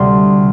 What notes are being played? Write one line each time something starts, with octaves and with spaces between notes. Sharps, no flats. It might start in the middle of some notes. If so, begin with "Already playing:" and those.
Already playing: D2 C3 G3 C6